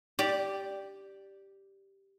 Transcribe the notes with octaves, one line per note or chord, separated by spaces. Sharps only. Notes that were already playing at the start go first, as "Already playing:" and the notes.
G4 D5